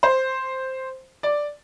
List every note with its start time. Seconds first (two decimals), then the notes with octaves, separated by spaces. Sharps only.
0.03 C5
1.23 D5